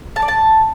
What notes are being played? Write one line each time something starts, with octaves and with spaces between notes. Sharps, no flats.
A5
D5
A5